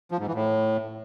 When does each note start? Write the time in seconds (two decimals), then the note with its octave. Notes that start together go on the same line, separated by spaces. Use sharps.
0.11 F3
0.19 G#2
0.27 E3
0.34 A2